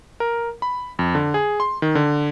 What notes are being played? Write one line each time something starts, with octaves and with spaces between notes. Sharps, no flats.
A#4
B5
F2
D3
G#4
C6
D#3
D3